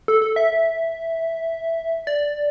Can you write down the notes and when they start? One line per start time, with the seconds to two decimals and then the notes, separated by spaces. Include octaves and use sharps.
0.08 A4
0.22 A4
0.36 E5
2.07 D5